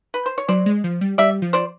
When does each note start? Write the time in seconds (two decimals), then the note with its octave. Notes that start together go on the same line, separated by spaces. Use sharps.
0.14 B4
0.26 C5
0.38 C#5
0.48 F#3 C5 D5
0.66 G#3
0.84 F3
1.01 G3
1.18 G3 D5 E5
1.42 F3
1.53 C5 D5